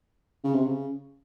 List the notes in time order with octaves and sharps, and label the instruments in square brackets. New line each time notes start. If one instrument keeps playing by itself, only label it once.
[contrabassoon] C#3
C3
C#3